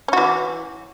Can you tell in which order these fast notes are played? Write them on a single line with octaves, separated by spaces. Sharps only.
C#4 F#4 E3